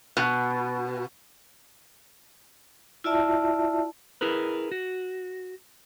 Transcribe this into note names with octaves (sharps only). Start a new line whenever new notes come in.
B2
E4 F4 D5 E5 A5
E4 G#4 A#4 B4
F#4